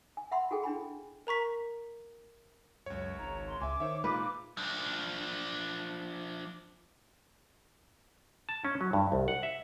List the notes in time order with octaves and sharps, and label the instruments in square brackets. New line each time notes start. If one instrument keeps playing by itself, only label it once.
[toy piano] G#5
E5 F#5 B5 C6
F#4 G#4 A4 G5
D4 E4 G#5 B5
[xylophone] A#4 A#5 C#6 B6
[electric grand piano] C#2 C#5 [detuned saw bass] F#2
[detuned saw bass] G#1 [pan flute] A#5
[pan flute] C6
[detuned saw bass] C#2 [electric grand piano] E5 G#5 C6 [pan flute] D6
[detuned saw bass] D#3 [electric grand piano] C5 C#5 E5
[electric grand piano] A#2 G#3 D#4 [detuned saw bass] F4 [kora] B4
[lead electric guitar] F3 D4
[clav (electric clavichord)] A5
C#4
F#3
G2
C2
F#5
E5